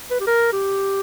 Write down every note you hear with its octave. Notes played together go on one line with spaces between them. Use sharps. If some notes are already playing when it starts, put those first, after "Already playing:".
B4
G4
A#4
G4